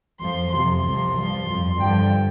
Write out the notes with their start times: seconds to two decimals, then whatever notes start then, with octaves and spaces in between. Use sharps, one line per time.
0.21 F2 F3 C6
0.53 F2 C3 F3 C6
0.86 C2 C3 F3
1.17 G2 F3
1.49 F2 F3
1.80 G2 D3 F3 G5